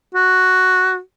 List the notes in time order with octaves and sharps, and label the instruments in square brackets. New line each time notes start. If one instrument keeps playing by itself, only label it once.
[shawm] F#4